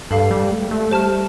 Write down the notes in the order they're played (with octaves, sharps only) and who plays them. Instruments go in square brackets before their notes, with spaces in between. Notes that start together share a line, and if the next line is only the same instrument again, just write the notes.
[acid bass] G2 [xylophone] A4 F5 A5
[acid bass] G3
A3
A3
[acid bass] G3 [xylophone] C5 A5 F6